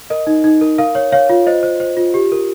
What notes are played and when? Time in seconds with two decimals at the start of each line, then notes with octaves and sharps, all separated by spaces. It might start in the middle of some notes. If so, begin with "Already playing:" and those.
0.10 A#4 D#5
0.27 D#4
0.44 D#4
0.61 A#4
0.78 A#4 F5
0.95 C#5
1.12 C#5 F5
1.29 F4
1.47 C5 D#5
1.63 C5
1.80 C5
1.97 F4
2.14 G4
2.32 A#4